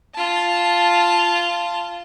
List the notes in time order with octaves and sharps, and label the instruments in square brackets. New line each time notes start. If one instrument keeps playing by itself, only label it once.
[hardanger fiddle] F4 A5